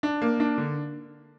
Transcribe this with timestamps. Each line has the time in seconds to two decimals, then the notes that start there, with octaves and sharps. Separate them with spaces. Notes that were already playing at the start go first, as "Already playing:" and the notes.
0.03 D4
0.22 A#3
0.40 D4
0.58 D3